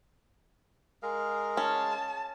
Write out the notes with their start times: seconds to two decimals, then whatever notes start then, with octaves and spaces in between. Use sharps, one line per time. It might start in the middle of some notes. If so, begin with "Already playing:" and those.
1.03 G#3 G#4 A#4 F5
1.57 C#4 A5